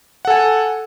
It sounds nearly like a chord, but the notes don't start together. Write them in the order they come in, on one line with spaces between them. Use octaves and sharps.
F#5 A4 G#5